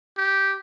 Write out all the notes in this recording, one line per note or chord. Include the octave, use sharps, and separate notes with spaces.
G4